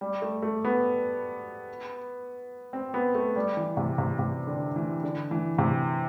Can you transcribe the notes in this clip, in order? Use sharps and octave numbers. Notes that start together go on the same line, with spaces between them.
G3
A3
A3
B3
C4
B3
A3
G3
E3
C3
C3
C3
D3
E3
D3
E3
C3